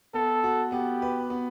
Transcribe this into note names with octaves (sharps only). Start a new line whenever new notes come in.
B3 A4
F#4
B3 G4
B4
B3